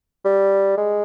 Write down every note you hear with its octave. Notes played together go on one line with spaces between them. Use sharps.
G3
G#3